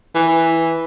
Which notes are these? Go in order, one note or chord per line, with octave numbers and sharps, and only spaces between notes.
E3